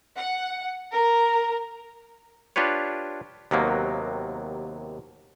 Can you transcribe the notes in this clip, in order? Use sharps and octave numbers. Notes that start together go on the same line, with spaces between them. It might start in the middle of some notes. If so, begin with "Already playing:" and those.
F#5
A#4
D4 F4 G4 B4 C#5
D#2 C3 F#3 A#3 B3